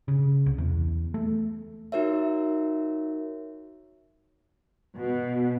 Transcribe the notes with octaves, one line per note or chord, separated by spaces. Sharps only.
C#3
C2
E2
A3
D#4 F#4 A#4 C#5 E5
B2